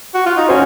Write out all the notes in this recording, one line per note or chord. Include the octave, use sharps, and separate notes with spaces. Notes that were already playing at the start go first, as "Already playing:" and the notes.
F#4
F4
D#4
C#4 F#4 C5